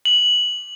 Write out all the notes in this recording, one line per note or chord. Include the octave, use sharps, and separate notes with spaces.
F#7